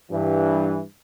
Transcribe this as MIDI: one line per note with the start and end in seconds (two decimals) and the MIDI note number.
0.12 0.80 43
0.12 0.80 52